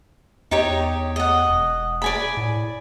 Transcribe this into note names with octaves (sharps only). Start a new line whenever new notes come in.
E2 D#4 G4 C#5
D#5 F#5
E1
D5 G#5 B5
A2